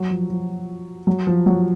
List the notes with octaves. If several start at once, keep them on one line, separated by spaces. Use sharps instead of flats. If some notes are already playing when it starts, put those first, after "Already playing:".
Already playing: F#3
F3
F3
F#3
F3
F#3